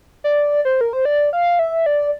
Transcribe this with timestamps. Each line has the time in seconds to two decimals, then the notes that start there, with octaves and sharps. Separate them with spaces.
0.24 D5
0.65 C5
0.81 A#4
0.93 C5
1.05 D5
1.33 F5
1.59 E5
1.86 D5